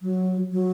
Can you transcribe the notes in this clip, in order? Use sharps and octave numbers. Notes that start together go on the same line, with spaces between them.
F#3
F#3